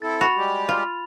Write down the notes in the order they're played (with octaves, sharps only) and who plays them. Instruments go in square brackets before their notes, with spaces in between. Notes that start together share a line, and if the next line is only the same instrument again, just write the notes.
[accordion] C4 E4 A4 [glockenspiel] A6
[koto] F#4 [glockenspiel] B5 F7
[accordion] G3 G#3 G4
[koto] F4